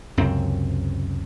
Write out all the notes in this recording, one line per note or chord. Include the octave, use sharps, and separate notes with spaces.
C#2 F#2 C3 C4